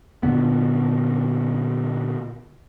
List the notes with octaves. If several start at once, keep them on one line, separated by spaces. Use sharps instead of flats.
A#2 D3 B3